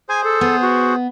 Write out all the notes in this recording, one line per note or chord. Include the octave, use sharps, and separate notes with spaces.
G#4 C5 G#5
A4
B3
F#4